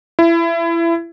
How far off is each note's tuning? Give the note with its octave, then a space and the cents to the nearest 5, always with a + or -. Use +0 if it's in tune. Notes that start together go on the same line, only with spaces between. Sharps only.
E4 +25